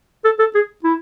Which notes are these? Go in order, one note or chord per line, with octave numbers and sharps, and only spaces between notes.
A4
A4
G#4
E4